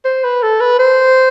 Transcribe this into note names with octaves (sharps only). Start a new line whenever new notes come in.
C5
B4
A4
B4
C5